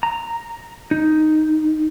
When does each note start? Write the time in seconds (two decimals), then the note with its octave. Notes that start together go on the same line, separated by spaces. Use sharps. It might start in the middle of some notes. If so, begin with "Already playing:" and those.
0.03 A#5
0.91 D#4